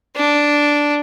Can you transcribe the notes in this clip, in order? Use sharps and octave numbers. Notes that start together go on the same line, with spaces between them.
D4